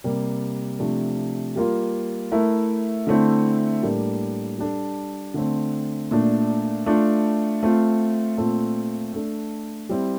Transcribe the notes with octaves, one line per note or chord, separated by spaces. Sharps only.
C3 G3 A#3
C3 F3 A3 D4 F4
G3 A#3 F4 A#4
A3 E4 A#4
D3 A3 C4 E4
A2 G3 A#3 D4
G3 D4 A4
D3 A3 C4
A#2 A3 D4
A3 D4 F4
A3 C4 F4
A#2 A3 C4 F4 A4
A3 D4 A4
G3 C4 E4